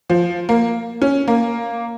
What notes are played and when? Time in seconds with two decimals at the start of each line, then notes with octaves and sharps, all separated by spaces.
0.10 F3
0.49 A#3
1.02 C#4
1.28 A#3